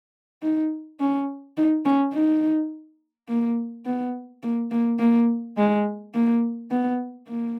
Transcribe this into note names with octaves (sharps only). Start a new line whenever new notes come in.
D#4
C#4
D#4
C#4
D#4
A#3
B3
A#3
A#3
A#3
G#3
A#3
B3
A#3